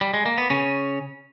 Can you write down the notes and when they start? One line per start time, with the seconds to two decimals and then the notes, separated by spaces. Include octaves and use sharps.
0.01 G3
0.14 G#3
0.26 A#3
0.38 B3
0.50 C#3 C#4